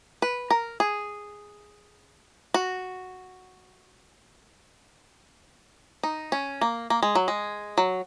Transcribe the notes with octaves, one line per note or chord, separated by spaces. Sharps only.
B4
A#4
G#4
F#4
D#4
C#4
A#3
A#3
G#3
F#3
G#3
F#3